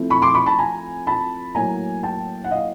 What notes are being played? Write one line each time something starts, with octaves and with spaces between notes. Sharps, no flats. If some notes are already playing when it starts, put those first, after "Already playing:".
Already playing: F3 A3 C4 E4
B5 C#6
C6 D6
B5 C#6
A5 B5
G#5 A#5
A5 B5
A2 F#3 A#3 G#5 A#5
G5 A5
F#5
D#5 F5